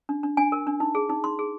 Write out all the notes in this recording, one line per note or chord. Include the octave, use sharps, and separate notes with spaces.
D4
D4
D4 G#5
A#4
D4
D#4
G#4
D#4
D#4 C6
G#4